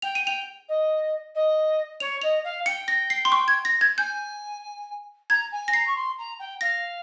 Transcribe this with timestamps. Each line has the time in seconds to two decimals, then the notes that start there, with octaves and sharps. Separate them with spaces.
0.02 G5 F7
0.15 D#7
0.24 G5 F7
0.68 D#5
1.34 D#5
2.00 C#5 F7
2.22 D#5 F7
2.44 F5
2.66 G5 C#7
2.88 A#6
3.10 C7
3.25 C6
3.32 C#6
3.48 G#6
3.65 A#6
3.81 G#6
3.98 G#5 G6
5.30 A#5 G#6
5.51 G#5
5.68 A#6
5.73 A#5 C7
5.86 C#6
5.95 C6
6.18 A#5
6.39 G5
6.61 F5 A#6